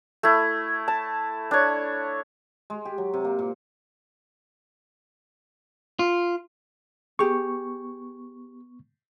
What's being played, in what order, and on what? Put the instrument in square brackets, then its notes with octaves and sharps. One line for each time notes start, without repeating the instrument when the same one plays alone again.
[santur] A3 E4
A5
D4 C#5
[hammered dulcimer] G#3
G4
F#3
C3
A#3
A#2
[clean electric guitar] F4
[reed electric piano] B3 C#6 [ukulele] G4 G#4